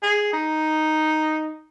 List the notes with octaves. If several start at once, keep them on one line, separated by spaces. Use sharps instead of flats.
G#4
D#4